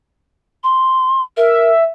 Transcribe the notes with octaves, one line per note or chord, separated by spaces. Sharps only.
C6
A#4 E5